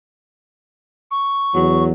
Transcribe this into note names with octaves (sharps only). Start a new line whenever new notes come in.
C#6
E2 F#3